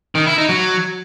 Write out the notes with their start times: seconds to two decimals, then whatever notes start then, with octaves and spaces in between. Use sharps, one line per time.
0.15 D#3
0.26 E4
0.38 D#4
0.49 F#3